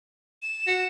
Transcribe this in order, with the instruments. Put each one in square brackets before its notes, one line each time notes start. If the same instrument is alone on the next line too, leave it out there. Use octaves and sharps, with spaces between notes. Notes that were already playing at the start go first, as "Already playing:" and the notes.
[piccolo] E7
[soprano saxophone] F#4